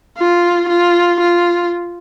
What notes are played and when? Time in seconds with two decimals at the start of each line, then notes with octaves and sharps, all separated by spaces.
0.18 F4
0.68 F4
1.20 F4